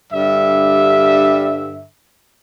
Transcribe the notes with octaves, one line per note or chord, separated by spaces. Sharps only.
G2 D3 G3 E5